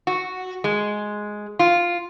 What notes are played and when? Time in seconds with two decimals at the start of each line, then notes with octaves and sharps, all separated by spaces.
0.07 F#4
0.64 G#3
1.59 F4